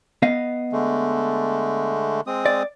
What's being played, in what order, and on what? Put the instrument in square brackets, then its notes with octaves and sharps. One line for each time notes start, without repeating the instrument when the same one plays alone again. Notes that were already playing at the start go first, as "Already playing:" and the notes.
[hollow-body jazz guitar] B3 D#5 F5
[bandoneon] D3 G#3 A3
G#3 C4 D#6
[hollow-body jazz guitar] D5